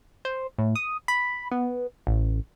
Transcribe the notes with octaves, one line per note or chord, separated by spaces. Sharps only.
C5
A2
D#6
B5
B3
A1